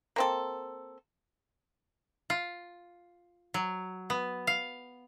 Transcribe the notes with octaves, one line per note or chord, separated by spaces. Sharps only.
A#3 C4 A4
F4
F#3
B3
F5